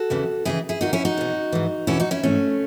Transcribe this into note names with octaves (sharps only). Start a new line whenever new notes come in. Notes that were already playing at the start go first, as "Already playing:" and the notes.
Already playing: F#4 A4
E2 C#3 E3
D#2 C#3 E3 E4 G#4
E4 G#4
D#2 D#3 D#4 F#4
C#4 E4
D#4 F#4
E2 B2
G#2 E3
E2 B2 C#4 E4
D#4 F#4
C#4 E4
G#2 E3 A3 C#4